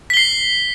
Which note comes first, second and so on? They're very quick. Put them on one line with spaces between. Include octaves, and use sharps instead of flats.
B6 G7 C7